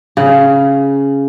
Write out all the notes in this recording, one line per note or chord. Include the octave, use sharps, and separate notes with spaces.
C#3